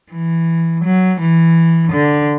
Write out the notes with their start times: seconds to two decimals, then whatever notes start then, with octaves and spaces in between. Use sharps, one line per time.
0.13 E3
0.85 F#3
1.21 E3
1.92 D3